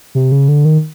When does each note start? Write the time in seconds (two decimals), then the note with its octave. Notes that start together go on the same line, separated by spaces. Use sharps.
0.15 C3
0.32 C#3
0.48 D3
0.65 D#3